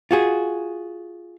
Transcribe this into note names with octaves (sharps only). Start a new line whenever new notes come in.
F4 F#4 G#4